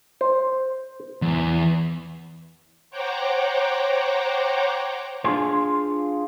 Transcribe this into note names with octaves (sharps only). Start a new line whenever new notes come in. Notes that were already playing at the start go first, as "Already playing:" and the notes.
C5
E2
C5 C#5 F#5 G5 A#5 D6
D4 F4 G#4 C5